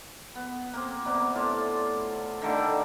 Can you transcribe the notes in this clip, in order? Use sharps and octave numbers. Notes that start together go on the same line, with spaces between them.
B3
A#3 C4
C3 G3 B3
A2 F4 D5
D3 D#3 G3 A3